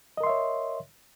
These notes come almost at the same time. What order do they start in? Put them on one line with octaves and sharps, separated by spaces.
D#5 A#4 C6 E5 C#5